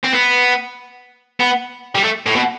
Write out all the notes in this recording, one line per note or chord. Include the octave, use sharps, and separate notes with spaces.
C4
B3
B3
G3
A3
A2
B2